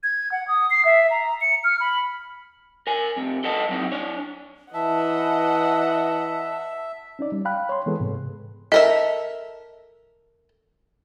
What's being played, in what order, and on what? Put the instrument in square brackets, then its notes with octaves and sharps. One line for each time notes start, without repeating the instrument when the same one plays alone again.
[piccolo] G#6
F#5
D#6
C7
E5
A#5
C#7
F6
B5
[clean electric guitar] A#4 G#5
F2 C3
A4 B4 D#5 F#5 A5
F#3 C4 D#4
D4 C#5
[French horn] E3 [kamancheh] D#5 F#5 [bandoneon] E5 [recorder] A5
[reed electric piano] C#4 D#4 D5
G3
F5 G5 B5 F#6
C#5 C6
E3 G#3 B3 G#4 A4 B4
G#2 C3
[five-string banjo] A4 A#4 E5 [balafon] D#5